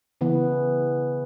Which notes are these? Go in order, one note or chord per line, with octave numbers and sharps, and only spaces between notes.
C#3 E3 B3